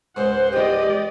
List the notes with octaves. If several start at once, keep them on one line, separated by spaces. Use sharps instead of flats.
C#2 G#2 C5 F#5
G4 D5 D#5